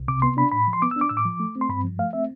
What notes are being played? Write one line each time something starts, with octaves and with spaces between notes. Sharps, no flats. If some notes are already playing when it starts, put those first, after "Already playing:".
Already playing: C2
C3 D6
B3 C6
D4 B5
A2 B5
F3
C6
B3 D6
E6
D4
D6
A2 E6
D6
F3
A3
C4
C6
G2 B5
F3
A3 F5
C4 E5